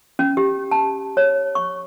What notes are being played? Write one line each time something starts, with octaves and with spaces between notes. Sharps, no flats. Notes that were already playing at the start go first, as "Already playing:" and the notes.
C#4
G4
A5
C#5
C#6